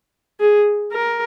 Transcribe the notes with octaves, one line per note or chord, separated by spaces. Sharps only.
G#4
A#4